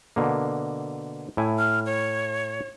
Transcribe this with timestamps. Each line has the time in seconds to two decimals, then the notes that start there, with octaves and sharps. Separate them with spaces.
0.16 B2 D3 A#3
1.37 A2 E4 G#5
1.58 F6
1.86 C#5